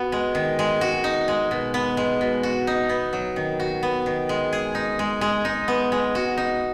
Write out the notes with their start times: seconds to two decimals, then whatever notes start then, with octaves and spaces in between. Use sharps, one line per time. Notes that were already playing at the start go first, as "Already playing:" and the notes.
Already playing: B3 F#4
0.12 G#3
0.35 D#3
0.59 G#3
0.81 F#4
1.04 D#4
1.28 G#3
1.51 B2
1.74 B3
1.97 G#3
2.21 B2
2.43 F#4
2.67 D#4
2.89 B3
3.13 F#3
3.36 D#3
3.60 F#4
3.83 B3
4.06 D#3
4.29 G#3
4.53 G#4
4.75 D#4
4.99 G#3
5.21 G#3
5.45 D#4
5.68 B3
5.92 G#3
6.15 F#4
6.38 D#4